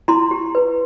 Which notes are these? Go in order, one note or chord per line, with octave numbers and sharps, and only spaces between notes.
E4 A#5 C6
G4
B4